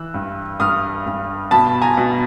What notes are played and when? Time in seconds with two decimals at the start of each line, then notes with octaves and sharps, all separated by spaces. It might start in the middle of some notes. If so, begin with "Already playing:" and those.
Already playing: E3 E6 F#6
0.14 G2
0.60 G2 D#6 F6
1.06 G2
1.51 B2 A5 B5
1.82 G#5 A#5
1.97 B2